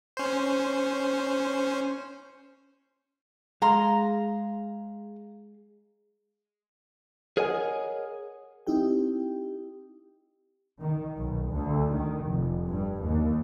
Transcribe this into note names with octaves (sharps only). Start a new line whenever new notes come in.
C#4 C5
G#3 F5 A#5 C6
G#4 A#4 C#5 D#5 F#5 G#5
C4 D#4 E4 G4 G5
D#3
B1
D2
D#3
F1
G2
D#2